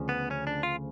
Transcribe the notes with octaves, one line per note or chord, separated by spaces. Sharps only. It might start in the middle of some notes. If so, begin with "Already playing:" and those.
Already playing: D2 C#3 F3
B3
C#4
D4
F4